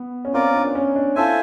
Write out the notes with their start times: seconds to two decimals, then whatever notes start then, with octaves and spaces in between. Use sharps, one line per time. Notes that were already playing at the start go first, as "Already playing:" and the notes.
Already playing: B3
0.25 C#4
0.33 C4 F4 A#4 D5
0.54 D4
0.75 C#4
0.96 D4
1.15 E4 F4 A4 C5 E5 G#5